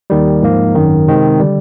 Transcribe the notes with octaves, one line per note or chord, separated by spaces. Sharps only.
D#2 D#3 G3
G#2 F3 A#3
G#1 F#2 D#3
C3 D#3 G#3 C4
D3 G3